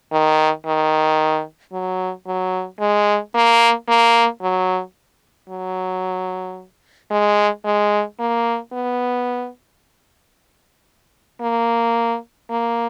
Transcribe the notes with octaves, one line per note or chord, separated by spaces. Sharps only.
D#3
D#3
F#3
F#3
G#3
A#3
A#3
F#3
F#3
G#3
G#3
A#3
B3
A#3
A#3